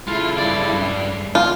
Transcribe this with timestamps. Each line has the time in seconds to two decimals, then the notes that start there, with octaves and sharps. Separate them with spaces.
0.08 C#3 G#3 E4 F4 A4
0.38 G2 D5
1.35 D3 B3 F4